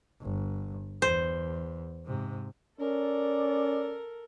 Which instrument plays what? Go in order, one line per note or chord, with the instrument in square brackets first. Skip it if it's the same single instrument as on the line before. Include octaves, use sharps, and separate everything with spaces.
[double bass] G1
[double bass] E2 [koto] C5
[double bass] G#2 C3
[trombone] C#4 [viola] A4 A#4 [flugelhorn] D5